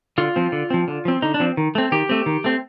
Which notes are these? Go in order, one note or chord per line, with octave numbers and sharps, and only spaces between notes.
D3 F4
F3 C4
D3
F3 C4
D3
F3 C4
D3 D#4
D4
F3 C4
D#3
A3 C4
D#3 G4
A3 C4
D#3
A3 C4